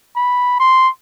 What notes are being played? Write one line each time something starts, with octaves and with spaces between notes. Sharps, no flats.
B5
C6